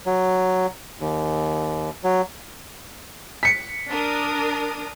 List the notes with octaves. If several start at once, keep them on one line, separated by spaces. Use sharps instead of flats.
F#3
D#2
F#3
B6 C#7
D4 A#4 D#6